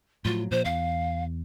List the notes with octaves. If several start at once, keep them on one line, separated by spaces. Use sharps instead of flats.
A2 F3 F#3 F4
A#2 F3 C5
E2 F5